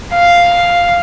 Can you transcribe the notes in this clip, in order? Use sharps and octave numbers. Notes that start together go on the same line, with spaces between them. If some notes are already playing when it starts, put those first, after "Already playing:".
F5